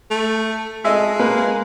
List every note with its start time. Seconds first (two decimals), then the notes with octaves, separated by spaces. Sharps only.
0.11 A3
0.85 G#3 A4 D#5 E5
1.19 A#3 B4